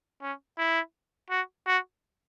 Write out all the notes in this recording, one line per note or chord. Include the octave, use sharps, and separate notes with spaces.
C#4
E4
F#4
F#4